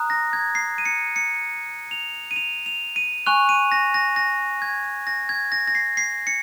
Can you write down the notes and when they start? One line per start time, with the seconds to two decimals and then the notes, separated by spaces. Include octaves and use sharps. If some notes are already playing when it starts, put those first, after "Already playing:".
Already playing: A#5 D#6 F#6
0.10 A#6
0.33 G#6
0.55 C7
0.78 D#7
0.85 C#7
1.16 C#7
1.91 F7
2.31 D#7
2.36 F7
2.66 F7
2.96 D#7
3.26 G#5 C#6 F#6 F7
3.49 D#7
3.72 A#6
3.94 A#6
4.16 A#6
4.62 G#6
5.07 A#6
5.29 G#6
5.52 A#6
5.67 A#6
5.75 C7
5.97 C7
6.27 C#7